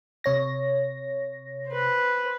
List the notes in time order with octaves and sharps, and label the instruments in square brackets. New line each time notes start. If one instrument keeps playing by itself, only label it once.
[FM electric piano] C3 C#5 A#6
[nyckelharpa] B4 C5